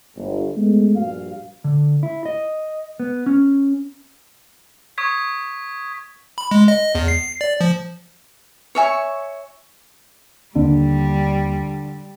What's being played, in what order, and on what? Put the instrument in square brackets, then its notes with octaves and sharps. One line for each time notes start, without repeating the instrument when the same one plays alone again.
[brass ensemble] G1
G#3 A3 B3
A#1 G2 F#4 F5
[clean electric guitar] D3
E4
D#5
B3
C#4
[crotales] C#6 D#6 G#6 B6
[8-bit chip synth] B5
G#3
D#5
E2
C7
D5
F3
[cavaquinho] C#5 E5 G#5 C#6
[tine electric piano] D#2 [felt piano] D3 [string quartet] G3